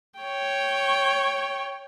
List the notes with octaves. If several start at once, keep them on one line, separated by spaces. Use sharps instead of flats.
C#5 G5